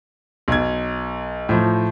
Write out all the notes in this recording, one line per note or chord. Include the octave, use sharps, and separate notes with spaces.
B1 G#6
A2 F3